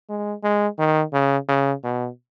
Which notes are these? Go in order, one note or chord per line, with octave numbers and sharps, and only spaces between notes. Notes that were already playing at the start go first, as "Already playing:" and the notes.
G#3
G#3
D#3
C#3
C#3
B2